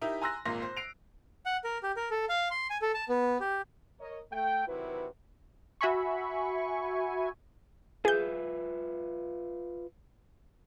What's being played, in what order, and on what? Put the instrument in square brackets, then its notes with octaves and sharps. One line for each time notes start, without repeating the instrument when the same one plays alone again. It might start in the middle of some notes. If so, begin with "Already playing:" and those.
[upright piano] D#4 E4 G4 A#4 E5
G#5 A#5 C6 E6 F#6 A#6
G#1 A#2 A#3 C6 A#6
C5
C7 D7 F7
[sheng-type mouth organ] F#5
A#4
G4
A#4
A4
F5
C6
G#5
A4
A5
B3
G4
[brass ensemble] A#4 C#5 D#5
A3 G5
C3 D#3 F#3 E4 F#4 B4
[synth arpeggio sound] F#4 E5 G#5 B5 C#6
[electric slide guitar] F4 B4 E5 [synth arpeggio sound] G#4 G6